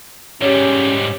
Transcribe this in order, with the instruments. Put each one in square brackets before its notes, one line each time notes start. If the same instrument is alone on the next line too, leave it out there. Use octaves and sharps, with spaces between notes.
[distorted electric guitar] G#2 G3 [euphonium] C#4 [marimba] G4 C#5